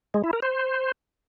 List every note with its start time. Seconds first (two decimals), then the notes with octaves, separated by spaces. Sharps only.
0.14 G#3
0.24 E4
0.33 A#4
0.42 C5